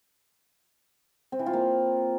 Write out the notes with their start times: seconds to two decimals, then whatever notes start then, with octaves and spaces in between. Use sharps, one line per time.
1.32 C4
1.39 E3
1.46 F4
1.53 A#3